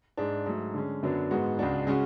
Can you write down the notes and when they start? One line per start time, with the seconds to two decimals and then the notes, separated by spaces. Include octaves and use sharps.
0.17 G#2 G#3 D4
0.46 G#2 F#3 A3
0.74 D3 G#3 C#4
1.02 F#2 D3 F#3 B3 D4
1.31 G#2 G#3 B3 F#4
1.59 C#2 C#3 G#3 D4 F#4
1.87 C#3 G#3 C#4 F#4